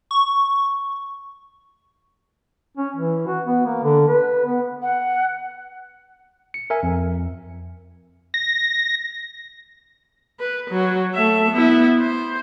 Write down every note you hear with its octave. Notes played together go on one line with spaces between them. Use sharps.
C#6
C#4
E3
F#4
B3
A#3
D3
B4
B3
F#5
C#7
A#4 E5 G#5
F2
A#6
B4
F#3
A3 E5
B3 E4
C5